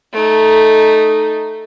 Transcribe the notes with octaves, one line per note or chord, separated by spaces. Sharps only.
A3 D#4